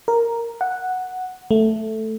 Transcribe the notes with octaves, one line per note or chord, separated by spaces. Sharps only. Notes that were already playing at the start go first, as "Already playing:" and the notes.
A#4
F#5
A3